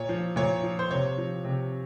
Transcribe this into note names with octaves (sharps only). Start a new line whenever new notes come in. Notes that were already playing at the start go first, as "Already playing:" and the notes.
Already playing: A#2 C#5
F3
A#2 C#5
F3
C5
C3 C#5
F3
C3